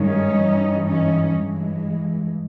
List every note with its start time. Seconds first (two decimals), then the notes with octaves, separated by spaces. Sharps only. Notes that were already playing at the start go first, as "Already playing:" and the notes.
Already playing: G2 D#3 G#3 C#4 D#4
0.40 G2 E3 G3
0.87 C#4 D#4
1.33 G2 E3 G#3